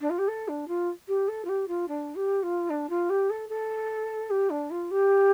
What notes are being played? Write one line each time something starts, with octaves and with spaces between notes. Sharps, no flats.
D4
F4
G4
A4
D4
F4
G4
A4
F4
G4
F4
D4
G4
F4
D4
F4
G4
A4
A4
G4
D4
F4
G4